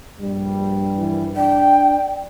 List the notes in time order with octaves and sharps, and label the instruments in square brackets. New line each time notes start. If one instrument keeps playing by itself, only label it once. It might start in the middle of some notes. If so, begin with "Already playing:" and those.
[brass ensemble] A#1 G2 G3
[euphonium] E3
[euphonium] D4 [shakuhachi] G5